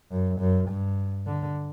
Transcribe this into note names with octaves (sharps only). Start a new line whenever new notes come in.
F#2
F#2
G2
D3